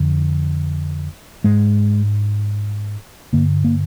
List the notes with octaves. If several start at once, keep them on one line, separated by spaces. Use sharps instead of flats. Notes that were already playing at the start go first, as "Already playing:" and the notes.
Already playing: F2 D3
G#2 G#3
G2 D3 A#3
A#3